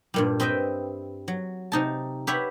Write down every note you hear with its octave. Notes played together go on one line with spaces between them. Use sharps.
G2 A#2 G3
C4 B4 D#5 E5 G5
F#3
C3 D#4 A5
G4 B4 C#5 E5 F#5